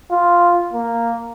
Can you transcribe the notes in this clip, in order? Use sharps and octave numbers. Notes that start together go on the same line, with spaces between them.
F4
A#3